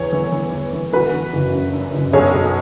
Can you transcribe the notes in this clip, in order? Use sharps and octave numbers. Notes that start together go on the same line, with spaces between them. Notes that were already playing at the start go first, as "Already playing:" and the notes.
Already playing: E2 E3 C#5
E3
E3
E2
E3
E3 F#4 B4
E3
F#1
F#2
F#2
F#1
B1 G#4 C#5
B2